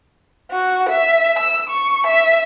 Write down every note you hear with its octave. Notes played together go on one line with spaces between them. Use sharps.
F#4
E5
E6
C#6
E5